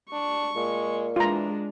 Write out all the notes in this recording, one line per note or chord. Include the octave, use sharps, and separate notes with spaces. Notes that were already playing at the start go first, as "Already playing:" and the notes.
D4 C#6
A#2 G#3
E3 G#3 D4 F4 A#5